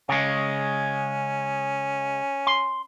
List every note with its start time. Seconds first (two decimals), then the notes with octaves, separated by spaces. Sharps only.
0.09 C#3 G#3 C#4
2.47 C6